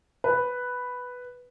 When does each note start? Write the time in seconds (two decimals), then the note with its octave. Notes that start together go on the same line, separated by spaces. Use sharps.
0.24 B4